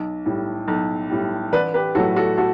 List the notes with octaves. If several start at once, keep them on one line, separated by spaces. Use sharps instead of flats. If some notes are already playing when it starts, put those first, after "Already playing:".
Already playing: B1
A2 G3
B1
A2 G3
A1 B4 D5
G4 B4
A2 F#3 A3 F#4 A4
F#4 A4
F#4 A4